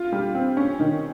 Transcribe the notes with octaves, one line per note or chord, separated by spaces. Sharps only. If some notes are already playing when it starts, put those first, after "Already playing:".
Already playing: F4
G3
C4
C#4
D#3